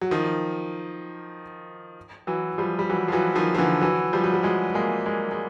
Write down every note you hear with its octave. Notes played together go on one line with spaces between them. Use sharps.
F#3
D#3 F3
E3 F#3
F3 G3
G3
E3 F#3
F3
E3 F#3
D#3 F3
F3
D3 E3
E3 F#3
F3 G3
F#3
G3
F#3 G#3
G#3 A#3
G#3 A#3
G#3